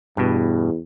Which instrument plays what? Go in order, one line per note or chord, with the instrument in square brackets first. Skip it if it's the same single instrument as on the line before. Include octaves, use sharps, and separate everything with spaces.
[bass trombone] E2 [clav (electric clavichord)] G2 B2